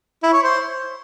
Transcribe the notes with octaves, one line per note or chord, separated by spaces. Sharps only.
E4
C#5
C5